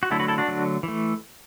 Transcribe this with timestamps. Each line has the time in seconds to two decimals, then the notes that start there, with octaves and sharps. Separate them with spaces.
0.03 F#4
0.11 D3 F#3 A3 E4 A4
0.20 F#4 B4
0.28 E4 A4
0.38 D4 F#4
0.48 D3 F#3 A3
0.83 E3
0.88 A3